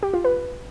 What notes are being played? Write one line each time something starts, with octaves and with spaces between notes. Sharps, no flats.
G4
F4
B4